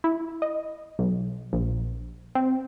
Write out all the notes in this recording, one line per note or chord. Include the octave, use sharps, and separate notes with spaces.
E4
D#5
B1
A#1
C4